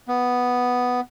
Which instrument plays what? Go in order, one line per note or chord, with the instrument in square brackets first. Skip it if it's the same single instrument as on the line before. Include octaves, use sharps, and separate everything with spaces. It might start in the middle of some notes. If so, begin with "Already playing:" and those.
[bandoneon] B3